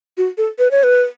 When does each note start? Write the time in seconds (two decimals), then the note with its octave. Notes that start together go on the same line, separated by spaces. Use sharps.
0.17 F#4
0.38 A4
0.59 B4
0.71 C#5
0.83 B4